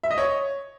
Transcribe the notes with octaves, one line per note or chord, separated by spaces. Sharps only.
E5
D#5
C#5